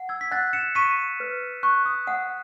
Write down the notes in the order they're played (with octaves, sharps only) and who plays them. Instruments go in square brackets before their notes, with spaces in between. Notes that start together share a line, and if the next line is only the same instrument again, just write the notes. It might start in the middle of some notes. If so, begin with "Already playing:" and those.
Already playing: [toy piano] F#5
[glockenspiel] E6 G#6
B6
[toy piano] F#5 [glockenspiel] F#6 A6
[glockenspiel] C#7 E7
[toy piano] C#6 [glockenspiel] B6 D#7
[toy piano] B4
[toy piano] C#6 [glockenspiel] F#6
[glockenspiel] D#6
[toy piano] F#5 [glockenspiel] D#6